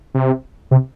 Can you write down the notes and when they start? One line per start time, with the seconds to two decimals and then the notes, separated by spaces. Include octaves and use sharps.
0.15 C3
0.71 C3